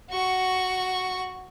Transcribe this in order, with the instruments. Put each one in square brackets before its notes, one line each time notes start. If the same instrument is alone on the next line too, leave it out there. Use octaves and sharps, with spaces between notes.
[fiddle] F#4 C#6